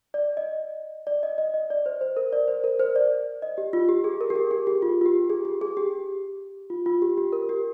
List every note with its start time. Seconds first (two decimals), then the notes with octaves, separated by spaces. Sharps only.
0.14 D5
0.37 D#5
1.07 D5
1.23 D#5
1.38 D#5
1.54 D#5
1.70 D5
1.86 C5
2.01 C5
2.16 A#4
2.33 D5
2.48 C5
2.64 A#4
2.79 C5
2.96 D5
3.42 D#5
3.58 G4
3.73 F4
3.89 G4
4.04 G#4
4.21 A#4
4.30 G4
4.36 G#4
4.51 G#4
4.67 G4
4.82 F4
5.01 F4
5.06 G4
5.30 G#4
5.45 G4
5.61 G#4
5.77 G4
6.70 F4
6.86 F4
7.02 G4
7.17 G4
7.33 A#4
7.49 G4